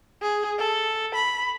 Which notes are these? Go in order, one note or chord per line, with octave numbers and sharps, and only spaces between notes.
G#4
A4
B5